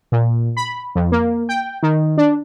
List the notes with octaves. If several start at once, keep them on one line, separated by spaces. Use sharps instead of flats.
A#2
B5
F2
A#3
G5
D#3
D4